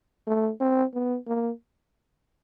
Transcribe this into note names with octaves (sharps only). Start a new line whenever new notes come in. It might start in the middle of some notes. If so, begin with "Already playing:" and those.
A3
C4
B3
A#3